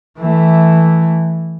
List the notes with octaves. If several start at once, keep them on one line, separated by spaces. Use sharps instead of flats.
E3 A3